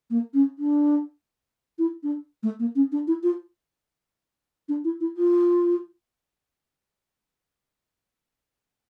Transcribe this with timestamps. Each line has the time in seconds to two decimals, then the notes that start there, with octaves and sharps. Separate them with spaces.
0.10 A#3
0.34 C#4
0.59 D4
1.79 E4
2.03 D4
2.43 A3
2.59 A#3
2.75 C#4
2.92 D4
3.07 E4
3.23 F4
4.69 D4
4.84 E4
5.00 E4
5.17 F4